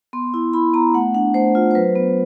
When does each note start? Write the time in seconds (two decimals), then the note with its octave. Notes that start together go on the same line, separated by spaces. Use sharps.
0.13 B3 C6
0.34 E4
0.53 E4 B5
0.74 B3 A#5
0.94 A3 F#5
1.14 D4 F#5
1.34 A3 C5
1.55 F4
1.71 C5
1.75 F#3 B4
1.95 B3